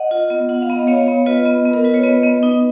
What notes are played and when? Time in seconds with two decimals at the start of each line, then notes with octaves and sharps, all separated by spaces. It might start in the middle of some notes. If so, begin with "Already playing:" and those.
Already playing: D#5 F#5
0.11 F4
0.30 B3
0.49 F4 F#5
0.62 F5
0.69 B3
0.75 D#5
0.87 B3 C#5 F5
1.08 B3
1.26 F4 B4 D#5
1.45 B3
1.65 B3
1.73 A#4
1.84 F4 B4
1.94 C#5
2.03 B3 B4 D#5
2.23 B3
2.43 D#4